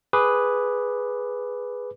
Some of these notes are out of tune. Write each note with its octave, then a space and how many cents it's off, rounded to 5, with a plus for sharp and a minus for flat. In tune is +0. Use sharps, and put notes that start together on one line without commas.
G#4 +0 B4 +0 D6 +0